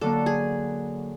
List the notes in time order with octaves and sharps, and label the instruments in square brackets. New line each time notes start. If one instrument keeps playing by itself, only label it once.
[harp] D3 F#3 A#3 [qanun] A4
[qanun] G#4